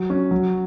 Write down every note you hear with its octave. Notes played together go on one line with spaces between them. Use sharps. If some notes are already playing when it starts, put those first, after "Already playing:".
Already playing: F#3
C#4 F#4
F#3